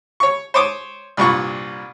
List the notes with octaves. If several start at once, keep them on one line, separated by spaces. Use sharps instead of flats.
C#5 C#6
C5 C#5 D6 D#6
C2 G2 A#2 C#6